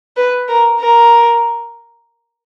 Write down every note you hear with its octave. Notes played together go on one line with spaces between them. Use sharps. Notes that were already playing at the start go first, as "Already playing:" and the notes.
B4
A#4
A#4